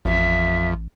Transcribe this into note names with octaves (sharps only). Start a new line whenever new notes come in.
A1 F2 E5